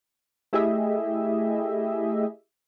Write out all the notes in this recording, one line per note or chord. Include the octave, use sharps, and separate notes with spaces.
A3 E4 G4 G#4 D#5 E5